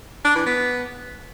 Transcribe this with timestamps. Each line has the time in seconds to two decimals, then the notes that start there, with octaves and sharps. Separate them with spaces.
0.25 D4
0.35 E3
0.46 B3